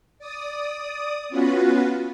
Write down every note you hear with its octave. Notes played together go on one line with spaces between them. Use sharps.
D5 D#6
B3 C#4 F4 F#4 B4